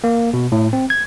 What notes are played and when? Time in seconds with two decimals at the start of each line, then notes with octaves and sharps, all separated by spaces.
0.04 A#3
0.34 B2
0.52 A2
0.73 C4
0.90 G#6